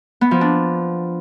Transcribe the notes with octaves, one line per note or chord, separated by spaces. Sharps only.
B3
F3
D4